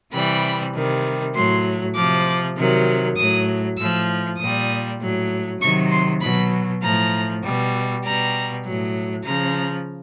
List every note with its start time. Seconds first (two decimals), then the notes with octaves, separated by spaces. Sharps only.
0.12 C3 E3 G3 B5
0.74 C3 D#3 G3
1.34 A2 F#3 C6
1.95 C3 F3 D6
2.57 C3 D#3 F#3
3.17 A2 F#3 D#6
3.78 A2 F3 E6
4.38 A#2 G3 D#6
5.00 A2 F#3
5.61 C3 D#3 F#3 C#6
5.91 C6
6.21 B2 F#3 B5
6.83 A2 F3 A#5
7.43 B2 G3
8.04 B2 G3 A#5
8.66 A2 F#3
9.26 C#3 F3 A#5